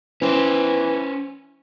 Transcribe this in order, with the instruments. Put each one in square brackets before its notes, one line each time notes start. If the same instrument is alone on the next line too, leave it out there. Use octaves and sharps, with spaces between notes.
[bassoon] E3 [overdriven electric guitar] C#4 C5